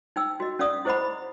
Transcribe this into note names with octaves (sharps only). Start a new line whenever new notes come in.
D#4 G5 E6
F#4 D#5
C#4 D5 F5 D#6
E4 G#4 C5 D#5 F#5 B5